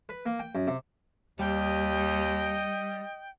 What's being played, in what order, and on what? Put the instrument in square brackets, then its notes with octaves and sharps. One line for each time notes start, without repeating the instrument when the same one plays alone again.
[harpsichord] B4
A#3
G5
F#2
C3
[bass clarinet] D#2 [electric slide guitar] G3 [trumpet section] D#5 [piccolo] G5